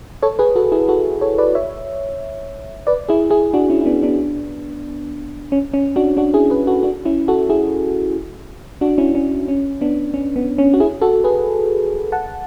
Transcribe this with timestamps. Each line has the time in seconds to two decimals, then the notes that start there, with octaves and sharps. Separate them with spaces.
0.23 A4 C#5
0.39 G#4 B4
0.56 F#4 A4
0.72 E4 G#4
0.89 F#4 A4
1.21 A4 C#5
1.38 B4 D5
1.55 C#5 E5
2.87 B4 D5
3.09 E4 G#4
3.31 E4 G#4
3.54 D4 F#4
3.70 C#4 E4
3.81 E4
3.86 B3 D4
4.03 B3 D4
5.52 C#4
5.74 C#4
5.96 D4 F#4
6.17 D4 F#4
6.33 E4 G#4
6.50 G#4 B4
6.67 F#4 A4
6.83 D4 F#4
7.05 C#4 E4
7.28 F#4 A4
7.49 E4 G#4
8.81 D4 F#4
8.98 C#4 E4
9.15 C#4
9.48 C#4
9.81 B3 D4
10.14 C#4
10.36 B3
10.58 C#4
10.74 F#4
10.80 E4 G#4
11.01 F#4 A4
11.24 G#4 B4
12.12 F#5 A5